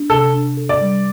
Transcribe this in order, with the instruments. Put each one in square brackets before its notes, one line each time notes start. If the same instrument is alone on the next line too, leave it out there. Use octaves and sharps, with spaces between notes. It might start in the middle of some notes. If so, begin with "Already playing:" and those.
Already playing: [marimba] D4
[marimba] C3 [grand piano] A4
[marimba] D4
A4
[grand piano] D5
[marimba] G3